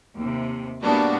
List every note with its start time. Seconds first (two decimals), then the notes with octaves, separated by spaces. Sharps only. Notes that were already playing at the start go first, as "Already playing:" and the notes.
0.17 D#2 C3
0.83 A2 G3 A#3 B3 D4 F#4